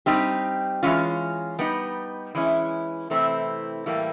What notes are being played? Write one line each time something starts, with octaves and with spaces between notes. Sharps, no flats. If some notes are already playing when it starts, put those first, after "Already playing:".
G3 C4 D#4 G4
E3 G#3 C#4 F4
G3 B3 D#4
E3 G#3 C#4 E4
C3 E3 A3 C4 E4
A2 E3 G3 A#3